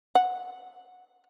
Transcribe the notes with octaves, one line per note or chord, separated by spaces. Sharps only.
F#5